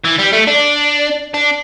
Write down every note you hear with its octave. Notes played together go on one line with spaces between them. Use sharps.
E3
G3
A3
D4
D4